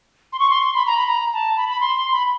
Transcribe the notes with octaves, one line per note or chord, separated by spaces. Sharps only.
C6
C#6
C6
C6
B5
A#5
B5
A#5
A5
B5
B5
C6
C6
B5